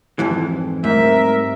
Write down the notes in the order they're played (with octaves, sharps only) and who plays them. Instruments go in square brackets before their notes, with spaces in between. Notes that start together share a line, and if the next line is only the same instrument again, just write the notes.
[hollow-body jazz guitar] F2 G#2 E3
[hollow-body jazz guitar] G#2 [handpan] G3 A3 C4 [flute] A#4 [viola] E5